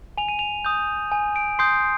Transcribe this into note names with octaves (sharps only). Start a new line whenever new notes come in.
G#5 F7
D#7
F7
D#6 G6
G#5
D7
C6 D#6 G6 C7